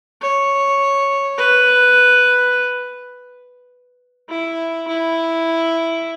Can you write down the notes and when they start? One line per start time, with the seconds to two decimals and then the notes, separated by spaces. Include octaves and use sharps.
0.22 C#5
1.38 B4
4.29 E4
4.88 E4